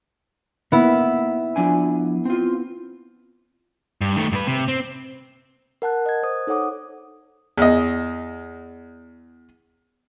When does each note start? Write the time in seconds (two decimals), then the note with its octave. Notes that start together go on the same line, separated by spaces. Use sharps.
0.72 A#3 B3 E4
1.56 F3 D4 G#5
2.25 C4 F4
4.01 G2
4.16 D#3 A3
4.32 G2 B4
4.47 C3
4.68 C4
5.82 A#4 F#5 A5 F#6
6.06 D#5 G#6
6.23 C5 D#6
6.47 D#4 A4 C#5 F#5 D6 D#6
7.57 E2 D#5